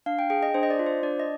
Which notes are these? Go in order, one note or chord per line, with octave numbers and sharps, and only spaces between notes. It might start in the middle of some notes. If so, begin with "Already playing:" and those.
D4 F5
G5
G#4 G5
D#5
D4 C5
D#5
D5
F4
C5
D4 D5
D#5